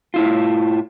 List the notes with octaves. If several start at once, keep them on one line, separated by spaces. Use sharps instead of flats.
A2 E4 F4